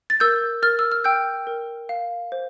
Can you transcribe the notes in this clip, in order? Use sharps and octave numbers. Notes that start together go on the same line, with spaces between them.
A6
A#4 E6 G6
A#4 F6 A6
E6
F6
G5 E6 G6
A#4
F5
C5